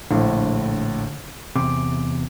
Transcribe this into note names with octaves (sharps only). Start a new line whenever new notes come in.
A#1 A2 D3
E2 C3 D6